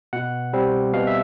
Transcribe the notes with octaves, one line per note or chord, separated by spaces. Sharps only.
B2 F#5
G3 C4
B2 F5
E5